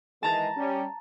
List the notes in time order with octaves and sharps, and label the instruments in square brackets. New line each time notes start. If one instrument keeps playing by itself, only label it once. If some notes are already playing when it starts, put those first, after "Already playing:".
[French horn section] D#3 E3 G#3 [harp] A5 A#5 A6
[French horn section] G3 C#4